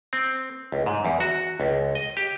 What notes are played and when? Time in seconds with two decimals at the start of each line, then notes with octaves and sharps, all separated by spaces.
0.13 C4
0.72 C#2
0.86 G#2
1.05 E2
1.20 F#4
1.60 C#2
1.95 D#5
2.17 G4